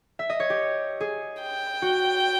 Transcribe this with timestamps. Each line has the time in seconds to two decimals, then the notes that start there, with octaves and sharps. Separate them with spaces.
0.19 E5
0.30 D#5
0.40 C#5
0.50 G4
1.00 G#4
1.42 G5
1.82 F#4